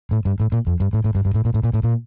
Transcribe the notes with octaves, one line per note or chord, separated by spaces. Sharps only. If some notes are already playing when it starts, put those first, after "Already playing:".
A2
G2
A2
A#2
F2
G2
A2
A2
G2
G2
A2
A#2
A2
A#2
A2
A#2